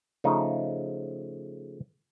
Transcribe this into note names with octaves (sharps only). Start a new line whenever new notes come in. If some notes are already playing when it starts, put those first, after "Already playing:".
C#3 F3 A3 D#4